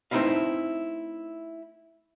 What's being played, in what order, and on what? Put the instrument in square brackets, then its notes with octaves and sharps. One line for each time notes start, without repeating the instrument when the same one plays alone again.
[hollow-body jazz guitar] A3 C4 D#4 E4 B4 F5